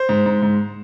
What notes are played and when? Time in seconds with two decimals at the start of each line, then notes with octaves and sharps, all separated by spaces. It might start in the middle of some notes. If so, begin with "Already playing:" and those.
Already playing: C5
0.09 G#2
0.26 G#2
0.42 G#2